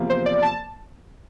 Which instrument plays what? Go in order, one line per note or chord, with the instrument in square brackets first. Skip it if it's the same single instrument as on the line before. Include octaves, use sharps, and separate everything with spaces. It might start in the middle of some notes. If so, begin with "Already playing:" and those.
Already playing: [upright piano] E2 C3 F3 A#3
[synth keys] C5
D5
A5